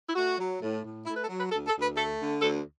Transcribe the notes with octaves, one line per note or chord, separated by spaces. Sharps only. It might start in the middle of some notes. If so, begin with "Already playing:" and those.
E4
A3 F#4
F#3
A2
A2
A3 E4
B4
A4
F#3
B4
D2 A4
A4
D2
B4
A3 A4
D3
D2 A4